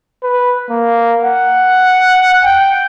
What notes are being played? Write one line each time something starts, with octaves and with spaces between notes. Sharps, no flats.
B4
A#3
F#5
G5